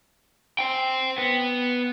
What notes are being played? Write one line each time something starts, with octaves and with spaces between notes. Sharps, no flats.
C5 G5
B3